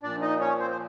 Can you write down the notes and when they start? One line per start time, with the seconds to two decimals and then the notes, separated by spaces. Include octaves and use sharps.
0.03 A#2 F3 D4 D5
0.21 D#4 D#5
0.40 C#4 C#5
0.59 C4 C5
0.71 C5